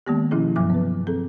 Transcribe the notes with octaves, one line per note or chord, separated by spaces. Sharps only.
D#3 G#3 A#3 B3 G4
B2 F3 C#4 E4 G#4
G2 C3 F3 F#3 D6
B3 B4
C4 G#4 A4